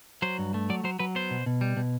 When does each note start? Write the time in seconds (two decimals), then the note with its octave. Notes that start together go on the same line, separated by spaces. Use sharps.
0.22 F#3 C5
0.39 G2
0.54 A3
0.70 F#3 D5
0.84 F#3 C5
0.99 F#3 B4
1.15 B3 C5
1.31 B2
1.46 B2
1.61 G3
1.77 B2